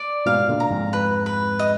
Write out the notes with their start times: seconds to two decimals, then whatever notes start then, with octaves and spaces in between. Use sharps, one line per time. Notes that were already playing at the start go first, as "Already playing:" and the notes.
Already playing: D5
0.26 G#2 B2 F5
0.48 A#2 D3
0.60 A#5
0.70 F2 G#2
0.93 B4
1.26 B4
1.59 D#5